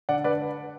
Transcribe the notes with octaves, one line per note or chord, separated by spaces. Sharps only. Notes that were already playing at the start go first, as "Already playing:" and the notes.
D3 D5 F#5
B4 D5